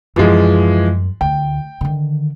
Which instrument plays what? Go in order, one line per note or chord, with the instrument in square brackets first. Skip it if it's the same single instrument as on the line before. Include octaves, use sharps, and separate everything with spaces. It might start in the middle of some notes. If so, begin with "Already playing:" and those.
[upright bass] F#2 A2 [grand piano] E3 F3 G#3
[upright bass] D2 [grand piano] G5
[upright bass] D3 D#3